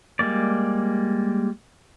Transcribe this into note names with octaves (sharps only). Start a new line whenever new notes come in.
G3 G#3 A#3 D5